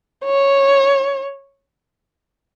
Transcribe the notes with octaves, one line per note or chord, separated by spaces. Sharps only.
C#5